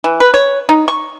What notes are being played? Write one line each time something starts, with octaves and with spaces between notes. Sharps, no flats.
E3
B4
C#5
D#4
C#6